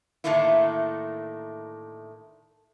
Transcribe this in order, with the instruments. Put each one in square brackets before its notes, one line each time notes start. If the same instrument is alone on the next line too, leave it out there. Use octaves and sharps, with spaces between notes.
[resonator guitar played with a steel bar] A2 D3 D#3 A3 A#3 E4